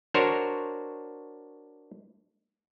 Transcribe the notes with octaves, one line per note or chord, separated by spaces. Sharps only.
D4 F#4 A#4 C5 C#5